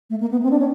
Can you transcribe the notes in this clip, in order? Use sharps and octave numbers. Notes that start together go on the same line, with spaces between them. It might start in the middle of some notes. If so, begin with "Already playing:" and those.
A3
A#3
B3
C4
D4
C#4